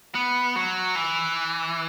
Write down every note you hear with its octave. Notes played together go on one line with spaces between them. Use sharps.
B3
F#3
E3